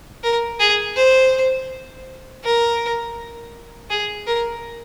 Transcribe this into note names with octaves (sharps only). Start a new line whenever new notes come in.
A#4
G#4
C5
A#4
G#4
A#4